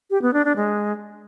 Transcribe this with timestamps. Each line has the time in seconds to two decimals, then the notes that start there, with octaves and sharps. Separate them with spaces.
0.10 G4
0.22 B3
0.33 D4
0.45 D4
0.56 G#3